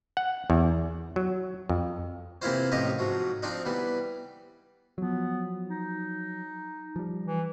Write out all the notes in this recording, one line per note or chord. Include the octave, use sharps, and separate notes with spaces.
F#5
E2
F#3
F2
C3 E3 A#3 E4 F4 C5
A1 C3 F3 D#4 G4 D#5
G#2 F3 F#3
F3 C4 D4 D#4
E3 G3 B3
F3 F#3 B3
D#4
F3 G3
E3